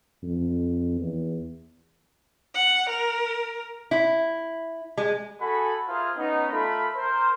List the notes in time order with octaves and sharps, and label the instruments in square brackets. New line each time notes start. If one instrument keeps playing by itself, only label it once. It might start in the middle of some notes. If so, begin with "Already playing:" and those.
[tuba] F2
E2
[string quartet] F#5
A#4
[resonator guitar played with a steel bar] E4
G#3
[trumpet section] F#4 G#4 A4 G#5 B5
F4 G#4 A#4 C5 E5 F5
B3 C#4 D#4
A3 F4 A4 A#4 B5
A#4 C5